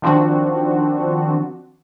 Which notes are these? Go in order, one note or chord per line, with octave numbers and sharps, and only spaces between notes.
D#3 F3 C4 D4 F#4